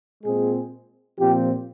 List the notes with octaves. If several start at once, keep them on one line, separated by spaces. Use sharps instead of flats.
A#2 G#3 C4 G#4
A#2 F3 C4 G4